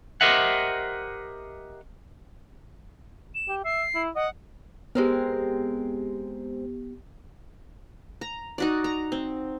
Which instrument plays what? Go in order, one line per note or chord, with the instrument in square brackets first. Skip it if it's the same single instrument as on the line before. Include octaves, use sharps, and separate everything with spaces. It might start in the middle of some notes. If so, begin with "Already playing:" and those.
[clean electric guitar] G4 A#4 C5 D#5 E5 F#5
[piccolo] E7
[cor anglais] G4
[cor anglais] E5 [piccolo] C7
[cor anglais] E4
[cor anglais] D#5 [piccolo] F#5
[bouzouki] G#3 C4 A#4 [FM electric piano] B3 G4
[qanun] A#5
D#4 F#4 D5
A#5
C4